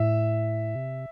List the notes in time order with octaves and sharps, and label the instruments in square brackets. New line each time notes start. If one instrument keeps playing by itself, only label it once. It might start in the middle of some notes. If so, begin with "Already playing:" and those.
Already playing: [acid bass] A2 [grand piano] E5
[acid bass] C3